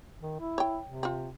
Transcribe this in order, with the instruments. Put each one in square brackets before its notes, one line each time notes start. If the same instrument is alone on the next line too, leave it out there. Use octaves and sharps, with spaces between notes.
[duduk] D#3
E4
[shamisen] C#5 G5
[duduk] C3
[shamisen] C4 F4